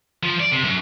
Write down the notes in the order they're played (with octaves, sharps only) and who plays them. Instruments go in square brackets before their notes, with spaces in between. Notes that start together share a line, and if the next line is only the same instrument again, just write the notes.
[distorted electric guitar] F3
D5
C3
F#2